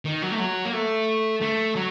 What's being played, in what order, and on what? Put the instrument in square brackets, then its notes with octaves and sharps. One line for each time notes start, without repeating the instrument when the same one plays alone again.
[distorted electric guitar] D#3
F#3
A3
F#3
A#3
A3
A3
F#3